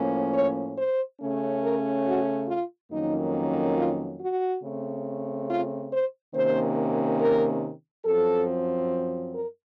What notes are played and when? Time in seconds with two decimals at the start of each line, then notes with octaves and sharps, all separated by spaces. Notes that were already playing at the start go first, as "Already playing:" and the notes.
Already playing: A2 F3 A#3 C#4
0.34 C#5
0.77 C5
1.20 C#3 A3 C#4
1.63 A#4
2.06 F#4
2.48 F4
2.91 F2 D#3 F#3 A#3 C#4 D#4
3.77 F4
4.20 F#4
4.63 C#3 A3 C4
5.49 F4
5.91 C5
6.34 C3 D#3 A#3 C#4 C5
7.20 A#4
8.05 F#2 F3 C4 A4
9.34 A#4